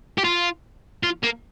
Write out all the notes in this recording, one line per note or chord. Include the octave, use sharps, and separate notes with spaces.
G4
F4
F4
A#3